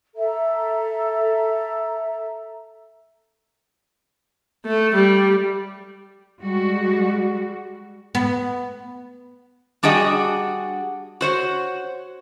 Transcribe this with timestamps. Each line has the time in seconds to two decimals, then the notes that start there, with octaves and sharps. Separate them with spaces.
0.16 A4 E5 A#5
4.66 A3
4.95 G3
6.41 G3 G#3 F#4
8.15 B3
9.83 G3 D4 F#4 G#4 D#5
11.21 F#4 C5 C#5